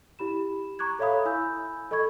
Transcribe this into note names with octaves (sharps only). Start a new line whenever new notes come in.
E4 G4 B5 E7
A#5 C#6 D6 F#6 G#6
A4 C#5 E5 F5 B5 D#6
E4 G#5 B5 E6 G6
A4 D#5 B5 C#6 G#6